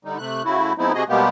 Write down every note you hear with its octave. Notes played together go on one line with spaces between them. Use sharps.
D3 G3 D#4
C3 A3 F#6
C#3 A3 E4 F#4
F3 G#3 B3 C4 D#4 E4
C3 F#4 G#4 D#5
B2 G3 G#3 A#3 B3 G4